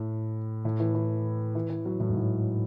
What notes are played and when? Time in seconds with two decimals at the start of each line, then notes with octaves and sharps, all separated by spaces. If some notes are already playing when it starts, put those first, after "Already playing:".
Already playing: A2
0.65 A2
0.80 E3
0.95 E3
1.55 E3
1.70 E3
1.85 F#3
2.00 A2
2.09 G#2
2.17 A2